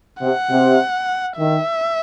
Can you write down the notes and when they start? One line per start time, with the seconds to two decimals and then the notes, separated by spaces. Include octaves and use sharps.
0.21 C3 F#5
0.50 C3
1.37 D#3 E5